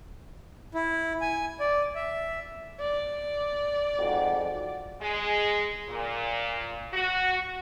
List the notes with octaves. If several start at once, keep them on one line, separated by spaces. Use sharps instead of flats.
E4
G#5
D5
E5
D5
F2 G#2 F#4
G#3
A#2
F#4